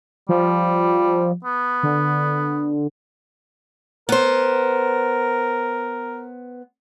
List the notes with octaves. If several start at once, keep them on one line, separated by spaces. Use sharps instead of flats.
F3 G3
B3
D3
B3 A#4 C5